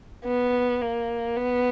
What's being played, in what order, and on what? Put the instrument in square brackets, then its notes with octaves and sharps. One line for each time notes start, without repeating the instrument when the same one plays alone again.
[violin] B3
A#3
B3